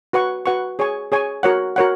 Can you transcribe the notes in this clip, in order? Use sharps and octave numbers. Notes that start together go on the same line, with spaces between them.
F#4 B4 F#5 C#6
F#4 B4 F#5 C#6
G#4 C#5 G#5 C#6
G#4 C#5 G#5 C#6
F#4 A#4 C#5 F#5
F#4 A#4 C#5 F#5